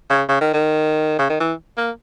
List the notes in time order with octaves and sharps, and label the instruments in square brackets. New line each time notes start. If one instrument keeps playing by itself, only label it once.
[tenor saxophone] C#3
C#3
D#3
D#3
C#3
D#3
E3
A#3